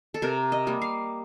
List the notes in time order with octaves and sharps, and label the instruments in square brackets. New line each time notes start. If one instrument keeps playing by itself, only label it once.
[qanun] A4
C3 A#4
D#5
G3 A#3
F5